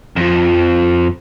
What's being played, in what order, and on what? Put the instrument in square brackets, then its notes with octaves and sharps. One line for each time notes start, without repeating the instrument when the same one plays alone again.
[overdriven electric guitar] F2 F3